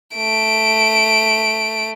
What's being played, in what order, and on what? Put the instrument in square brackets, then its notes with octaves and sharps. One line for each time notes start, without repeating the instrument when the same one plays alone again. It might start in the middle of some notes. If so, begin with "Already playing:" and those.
[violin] A3 D7